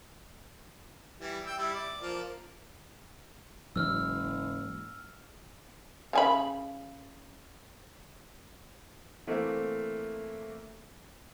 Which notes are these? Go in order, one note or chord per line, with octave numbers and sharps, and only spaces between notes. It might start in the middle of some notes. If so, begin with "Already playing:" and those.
E3 G3
G5 E6
G3 E4
D5
F3 A#3
F#1 G#2 E3 F#3 E6 F6
C#3 G#5 B5
E3 A3 A#3 C4